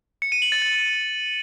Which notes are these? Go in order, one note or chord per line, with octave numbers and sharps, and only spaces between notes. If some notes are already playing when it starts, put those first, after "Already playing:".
C#7
D#7
F#7
A6
A6